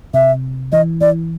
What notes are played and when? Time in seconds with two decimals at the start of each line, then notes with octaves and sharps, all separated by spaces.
0.14 C3 E5
0.72 E3 D#5
1.01 E3 D5